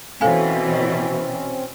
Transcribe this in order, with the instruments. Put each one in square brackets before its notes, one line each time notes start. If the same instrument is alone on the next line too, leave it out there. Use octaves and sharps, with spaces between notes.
[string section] B2 E3 [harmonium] C4 C#4 [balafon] A4 F5 G#5